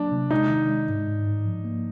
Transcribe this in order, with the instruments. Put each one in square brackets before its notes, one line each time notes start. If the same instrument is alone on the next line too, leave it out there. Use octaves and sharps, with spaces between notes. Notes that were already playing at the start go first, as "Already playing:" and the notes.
Already playing: [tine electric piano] F#3 A#3 [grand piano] D4
[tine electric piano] C3
[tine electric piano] G#3 [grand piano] D#4
[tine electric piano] D#3
G#3
G#2
G#2
G#2
F3
A#3